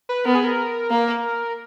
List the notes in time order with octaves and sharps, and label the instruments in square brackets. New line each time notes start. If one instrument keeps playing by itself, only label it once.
[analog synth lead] B4
[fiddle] B3 [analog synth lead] A#4
[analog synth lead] G#4
A#4
[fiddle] A#3